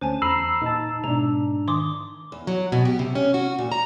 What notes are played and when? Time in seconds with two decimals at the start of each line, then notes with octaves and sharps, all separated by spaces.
0.01 D2 C#4 C5 G#5 A5
0.22 E2 A#5 B5 E6 C7
0.62 A#2 D#4 A5
1.04 G#2 B2 D4 A#5
1.68 D#3 C6 D6 D#6
2.32 E2
2.47 F#3
2.72 B2
2.85 G4
2.99 C3
3.15 C#4
3.34 F#4
3.59 A#2
3.72 A#5